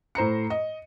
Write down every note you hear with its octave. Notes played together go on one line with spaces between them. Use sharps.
A2 C5 A#5 C#7
D#5